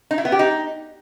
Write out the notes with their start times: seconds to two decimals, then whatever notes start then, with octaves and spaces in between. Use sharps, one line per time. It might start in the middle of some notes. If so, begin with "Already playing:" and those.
0.11 D#4
0.18 E4
0.25 B3
0.32 G4
0.39 D#4